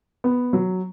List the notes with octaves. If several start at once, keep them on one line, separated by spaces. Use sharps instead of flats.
B3
F#3